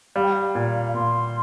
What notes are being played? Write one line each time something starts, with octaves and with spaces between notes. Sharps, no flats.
G3 F5
G5
F5
A#2
A#2 C6